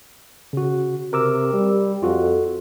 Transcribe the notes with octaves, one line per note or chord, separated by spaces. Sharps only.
C#3 F#4
C3 A#4 D6 E6
G3
F2 F4 F#4 A4